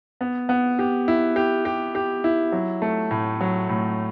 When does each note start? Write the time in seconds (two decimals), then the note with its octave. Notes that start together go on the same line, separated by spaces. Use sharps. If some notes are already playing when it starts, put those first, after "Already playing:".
0.21 B3
0.49 B3
0.79 G4
1.08 E4
1.36 G4
1.65 G4
1.95 G4
2.24 E4
2.52 F#3
2.82 A3
3.11 A2
3.41 F#3
3.69 A2